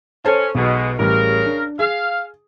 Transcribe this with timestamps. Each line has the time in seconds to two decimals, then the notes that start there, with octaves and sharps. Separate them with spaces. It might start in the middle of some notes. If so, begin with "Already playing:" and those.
0.25 C#4 A4 C5 A5
0.55 B1 B2 G#3
0.99 A1 C#3 G3 A#4
1.45 D4
1.79 G#4 F5